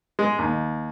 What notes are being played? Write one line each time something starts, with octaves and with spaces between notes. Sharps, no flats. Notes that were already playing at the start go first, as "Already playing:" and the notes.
G#3
D#2